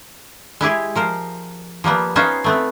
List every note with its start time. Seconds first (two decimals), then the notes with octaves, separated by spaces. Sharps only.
0.61 G#3 E4 G4 G#4
0.95 F3 A#4 C5
1.84 F3 G3 A#3 B3
2.16 B3 C#4 D#4 F4 C5
2.44 A3 B3 C4